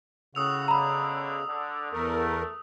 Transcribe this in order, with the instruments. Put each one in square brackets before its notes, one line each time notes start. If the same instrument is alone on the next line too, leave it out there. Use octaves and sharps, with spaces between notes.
[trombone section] A2 F#4 [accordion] C#3 [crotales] D#6 E6 F7
[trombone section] B2 D3 [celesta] A#5 B5
[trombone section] D3
[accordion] E2 A#4 [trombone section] A3